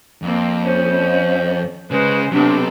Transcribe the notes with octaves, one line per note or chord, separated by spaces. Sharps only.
F2 A#3 C4
C#4 C5
C#3 G#3 B4 C5
C3 F#3 B3 C4 D4